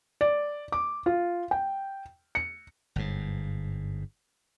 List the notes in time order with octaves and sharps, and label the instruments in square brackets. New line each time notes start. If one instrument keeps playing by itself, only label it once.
[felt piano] D5
D6
F4
G5
C#7
[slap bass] G1 G#2